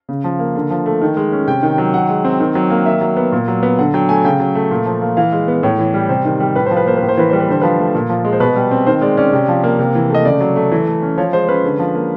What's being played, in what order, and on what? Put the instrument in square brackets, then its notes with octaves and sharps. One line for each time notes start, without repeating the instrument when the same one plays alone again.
[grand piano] C#3
F3
A#3
D3
F3
A3
D#3
G#3
C#4
C3 G5
D#3
F#3
D#3 F#5
G#3
C4
D#3
F#3
A#3
D#3 E5
F#3
B3
A#2
F#3
B3
D3 F#5
F#3 G5
A3 G#5
C#3 G5
F#3
A3
A#2
F3
A#3
E3 F5
G#3
B3
A2 C#5
E3
G3
C3 C5
D#3
G3
A2 B4
F3 C5
B4
A#3 C5
A2 B4
C5
E3 B4
G3 C5
B4
D3 C5
F3 B4
A3
A#2
F3
G#3
C5
B2 B4
G3
C4
D#3 C5
G#3 D5
C#4 D5
C3
F3
A#3
C3
E3
A3 D#5
C#3 D5
F#3
A3
E3
A3
C#4
F3 C#5
G#3 C5
C#4 B4
D3
F3
A#3